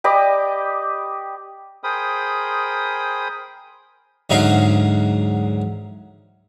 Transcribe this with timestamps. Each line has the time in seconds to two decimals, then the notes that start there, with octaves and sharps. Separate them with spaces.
0.04 G4 D5 D#5 B5
1.84 G#4 A#4 C5 G5 B5 D#6
4.30 D2 G#2 F#3 C#4 D#4 F5